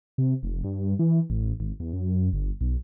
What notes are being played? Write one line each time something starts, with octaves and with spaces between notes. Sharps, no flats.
C3
F1
G2
E3
A1
G#1
E2
F#2
G1
B1